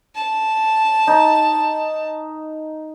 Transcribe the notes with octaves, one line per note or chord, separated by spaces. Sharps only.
A5
D#4